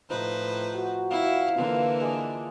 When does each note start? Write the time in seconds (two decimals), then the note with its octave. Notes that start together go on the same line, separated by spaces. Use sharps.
0.10 A2 F3 D#4 B4 C5
0.75 F#4
1.11 E4 F5
1.57 D3 E3 A#3 F4 B4
2.01 G#3 D4